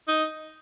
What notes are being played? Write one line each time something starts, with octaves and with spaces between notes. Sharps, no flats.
D#4